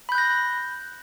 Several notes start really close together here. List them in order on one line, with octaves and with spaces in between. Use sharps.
B5 G6 F#6 A#6